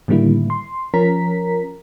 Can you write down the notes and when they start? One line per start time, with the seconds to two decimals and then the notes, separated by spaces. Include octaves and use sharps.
0.08 A2 D3 D#3 G3 A#3 E4
0.50 C6
0.94 F3 C#4 A#4 A#5 B6